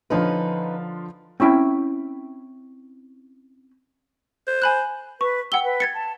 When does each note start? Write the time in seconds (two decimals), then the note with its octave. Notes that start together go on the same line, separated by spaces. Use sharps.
0.10 D3 F3 C#4 D#4 F4 B4
1.40 C4 C#4 E4 G5
4.47 C5
4.62 G#5 B5 F#6
5.21 B4 C#6
5.52 F#5 G5 E6 G7
5.64 B4
5.80 G#6 A6 C#7
5.94 A5